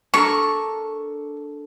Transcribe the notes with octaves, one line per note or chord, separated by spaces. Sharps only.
D4 A4 A#4 C#6